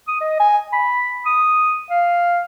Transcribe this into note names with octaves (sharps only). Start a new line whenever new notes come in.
D#6
D#5
G#5
B5
D#6
F5